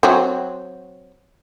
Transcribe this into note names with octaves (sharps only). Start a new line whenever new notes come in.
F#3 C4